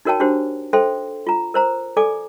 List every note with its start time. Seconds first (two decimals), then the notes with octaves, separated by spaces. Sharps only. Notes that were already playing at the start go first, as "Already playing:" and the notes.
0.05 D#4 F#4 A#4 C#5 G5 A5
0.20 D4 F#4 G4 C5
0.73 A4 C5 E5 G5 C6
1.27 F4 A#5
1.54 A#4 C5 A#5
1.97 A4 D5 G#5 D6